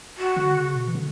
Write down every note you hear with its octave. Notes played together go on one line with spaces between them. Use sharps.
F#4
D3
C#3
B2
E3
D3